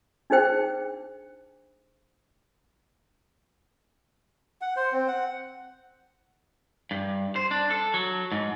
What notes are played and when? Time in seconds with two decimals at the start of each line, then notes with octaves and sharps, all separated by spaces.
0.30 D4 D#4 G#4 C5 G5
4.61 F#5
4.76 C5
4.92 C4
5.08 F#5
6.91 G2
7.36 C5
7.51 D4
7.70 A4
7.94 F#3
8.32 G#2